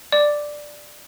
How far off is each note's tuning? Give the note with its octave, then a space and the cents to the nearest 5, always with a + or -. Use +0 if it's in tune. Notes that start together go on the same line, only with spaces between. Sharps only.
D5 +5 D6 +0